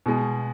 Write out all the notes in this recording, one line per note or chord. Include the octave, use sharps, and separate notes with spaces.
B2 G#3